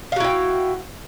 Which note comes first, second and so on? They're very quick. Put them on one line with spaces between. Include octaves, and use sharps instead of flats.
F5 F#4 E4 G5